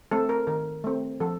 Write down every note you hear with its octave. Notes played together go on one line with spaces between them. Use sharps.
A3 C4 A4
A#4
D#3 A#4
A3 C4
F3 A4